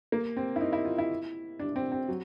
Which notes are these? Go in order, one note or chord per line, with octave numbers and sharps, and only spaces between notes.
A#3
C4
E4
D#4
E4
F4
E4
D4
C4
C4
F#3